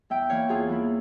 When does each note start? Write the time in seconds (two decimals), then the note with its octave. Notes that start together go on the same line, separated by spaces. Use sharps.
0.10 E2 E5 G5
0.30 E3 A#3 E4 C#5 F5
0.49 E2 F4 G#4
0.69 E3 A#3 E4